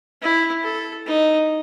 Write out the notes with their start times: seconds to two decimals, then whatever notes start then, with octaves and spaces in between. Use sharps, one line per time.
0.22 E4
0.64 A4
1.06 D#4